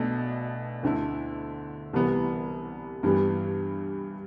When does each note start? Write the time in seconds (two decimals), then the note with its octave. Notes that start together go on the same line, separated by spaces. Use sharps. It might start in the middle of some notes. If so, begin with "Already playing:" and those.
Already playing: B1 B2 A3 D4 A4
0.83 D2 D3 A3 E4
1.93 C2 C3 E3 G3 B3
3.03 G2 E3 G3 B3